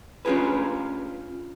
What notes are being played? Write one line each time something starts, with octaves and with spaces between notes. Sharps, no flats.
C#4 D4 F4 G4 G#4 B4